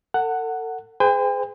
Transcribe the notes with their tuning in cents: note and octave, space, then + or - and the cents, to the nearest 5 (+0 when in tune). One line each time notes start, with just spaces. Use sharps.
A4 +40 F#5 +0
G#4 +10 C5 -45 G5 +40